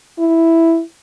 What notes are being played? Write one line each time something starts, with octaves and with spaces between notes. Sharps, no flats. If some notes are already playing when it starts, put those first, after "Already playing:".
E4